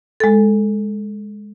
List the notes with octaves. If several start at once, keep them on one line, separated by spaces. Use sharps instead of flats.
G#3 A4